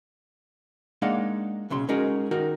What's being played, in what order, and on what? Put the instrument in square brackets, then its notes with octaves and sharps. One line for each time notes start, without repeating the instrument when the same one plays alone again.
[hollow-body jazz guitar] G#3 A#3 D4 D#4 F5 F#5
B1 C#3 F#3 C6
G#3 C#4 D#4 F#4 G#4 A#4
D#3 D#4 F#4 A#4